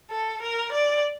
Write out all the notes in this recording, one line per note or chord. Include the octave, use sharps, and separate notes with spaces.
A4
A#4
D5